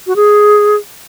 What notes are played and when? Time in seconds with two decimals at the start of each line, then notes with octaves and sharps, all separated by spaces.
0.07 F#4
0.16 G#4